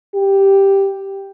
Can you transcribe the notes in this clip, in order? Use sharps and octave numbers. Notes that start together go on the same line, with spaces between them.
G4